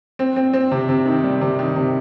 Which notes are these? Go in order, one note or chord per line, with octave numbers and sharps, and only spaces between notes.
C4
C4
C4
C3
C3
D#3
G3
C3
D#3
C3